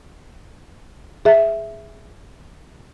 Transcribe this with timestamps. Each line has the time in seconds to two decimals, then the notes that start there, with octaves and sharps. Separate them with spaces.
1.25 G#4 E5